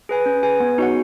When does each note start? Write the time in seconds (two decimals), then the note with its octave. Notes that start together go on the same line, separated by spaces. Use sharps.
0.09 G#4 B4 G#5
0.26 C#4
0.43 G#4 B4 G#5
0.60 B3
0.78 D#4 F#4 C#5 F#5